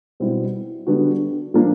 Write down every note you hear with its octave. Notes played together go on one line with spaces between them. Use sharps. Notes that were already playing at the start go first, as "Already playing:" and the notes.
B2 G3 C4 E4 G4
D3 G3 B3 D4 F#4
A#2 F3 A#3 D4 F4